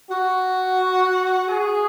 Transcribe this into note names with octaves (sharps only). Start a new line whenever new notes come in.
F#4
G#4